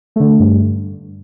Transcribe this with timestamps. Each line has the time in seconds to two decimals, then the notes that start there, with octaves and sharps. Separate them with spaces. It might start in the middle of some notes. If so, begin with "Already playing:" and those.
0.16 D3 A3
0.40 G2